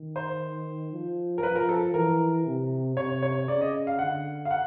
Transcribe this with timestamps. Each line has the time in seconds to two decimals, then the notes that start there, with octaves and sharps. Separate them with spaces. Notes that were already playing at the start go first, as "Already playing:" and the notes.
Already playing: D#3
0.16 C5
0.92 F3
1.38 A#4
1.43 F3 B4
1.55 A#4
1.69 A4
1.94 E3 A#4
2.46 C3
2.97 C3 C#5
3.23 C#5
3.48 C#3 D5
3.61 D#5
3.87 F5
3.99 D3 F#5
4.45 F5
4.51 F#5